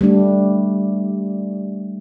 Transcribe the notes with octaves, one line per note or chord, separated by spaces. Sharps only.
G3 A3 D4